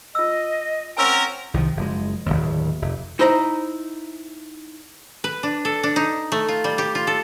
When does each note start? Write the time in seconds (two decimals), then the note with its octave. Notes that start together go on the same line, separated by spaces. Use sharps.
0.15 F4 D#5 E6
0.97 C4 C#4 A#4 F#5 G#5 E6
1.54 C2 D#3 F3
1.77 F#1 F3 G#3
2.26 D1 G#1 D#2
2.82 F1
3.19 D#4 E4 C5 D#5 G5 A#5
5.24 B4
5.43 D4
5.65 A4
5.83 D4
5.96 D#4
6.32 A3
6.49 F4
6.64 G3
6.78 G4
6.95 F4
7.07 A4